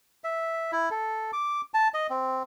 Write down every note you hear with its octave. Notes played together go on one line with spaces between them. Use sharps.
E5
E4
A4
D6
A5
D#5
C4